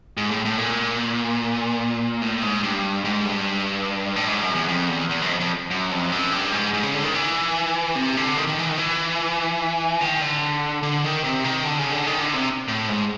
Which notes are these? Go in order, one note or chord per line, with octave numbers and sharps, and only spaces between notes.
G#2
A2
A2
A#2
A2
G#2
G2
G#2
G2
A2
G#2
F#2
E2
F2
E2
E2
F#2
F2
F2
F#2
F2
F#2
G2
G#2
G#2
C#3
D3
D#3
E3
C3
D3
D#3
D#3
E3
D#3
E3
D#3
D3
D3
D#3
C3
D#3
D3
C#3
D3
D#3
D3
C3
A2
G#2